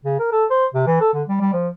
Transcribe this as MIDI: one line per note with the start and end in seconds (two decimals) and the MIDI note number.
0.05 0.17 49
0.19 0.28 70
0.32 0.45 69
0.50 0.66 72
0.75 0.85 48
0.87 1.00 52
1.01 1.11 69
1.14 1.23 50
1.28 1.40 55
1.41 1.51 55
1.53 1.69 53